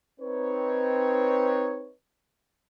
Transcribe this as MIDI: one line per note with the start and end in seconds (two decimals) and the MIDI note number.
0.20 1.92 60
0.20 1.92 63
0.20 1.92 71
0.20 1.92 73